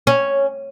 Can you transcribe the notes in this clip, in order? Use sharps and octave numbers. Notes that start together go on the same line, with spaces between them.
C#4